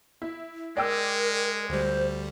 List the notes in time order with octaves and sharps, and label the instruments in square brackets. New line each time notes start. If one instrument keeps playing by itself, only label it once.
[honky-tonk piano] E4
[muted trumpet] G#3 [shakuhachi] A#4 [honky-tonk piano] D5 G5 E6
[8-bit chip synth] D2 G3 [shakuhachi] C5